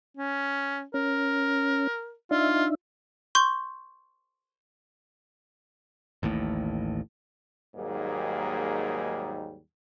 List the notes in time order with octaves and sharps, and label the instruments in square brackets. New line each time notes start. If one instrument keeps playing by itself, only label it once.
[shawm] C#4
[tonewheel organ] C#4 [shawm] A#4
[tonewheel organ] D4 D#4 E5 [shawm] F4
[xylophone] C6 C#6 G6
[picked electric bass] A1 D#2 A2
[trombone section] D#2 G#2 F#3 G3 A#3 G#4